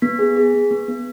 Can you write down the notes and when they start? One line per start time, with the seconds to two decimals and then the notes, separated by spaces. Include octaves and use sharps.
0.02 B3 B6
0.19 G#4
0.36 G#4
0.54 B3
0.71 B3
0.88 B3